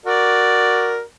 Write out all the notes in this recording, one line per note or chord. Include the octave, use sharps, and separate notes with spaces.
F#4 A#4 D5